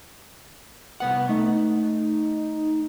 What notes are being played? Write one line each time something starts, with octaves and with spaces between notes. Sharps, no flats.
C2 B3 F#5
A3 D#4